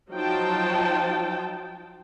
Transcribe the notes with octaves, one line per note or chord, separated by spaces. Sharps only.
F3 F#3 D#4 F4 G5 A5